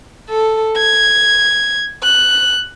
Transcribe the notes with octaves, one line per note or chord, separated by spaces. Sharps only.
A4
G#6
F#6